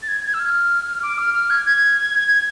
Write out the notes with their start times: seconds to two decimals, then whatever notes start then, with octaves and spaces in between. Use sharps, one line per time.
0.03 A6
0.08 G#6
0.24 G#6
0.34 E6
0.40 F6
1.02 D6
1.18 F6
1.34 F6
1.50 G#6
1.66 G#6
2.28 G#6